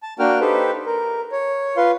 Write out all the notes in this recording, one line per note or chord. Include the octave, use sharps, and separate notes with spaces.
A5
A#3 D4 F#4 A#4 G5 F6
D#4 G4 A4 B4 C5
A#4
C#5
F4 B4 F5 C6